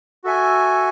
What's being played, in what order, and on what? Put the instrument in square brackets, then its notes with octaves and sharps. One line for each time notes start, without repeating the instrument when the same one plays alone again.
[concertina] F#4 A4 E5 G#5